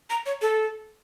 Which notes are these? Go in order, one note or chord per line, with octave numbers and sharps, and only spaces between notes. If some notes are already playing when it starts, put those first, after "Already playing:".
A#5
C#5
A4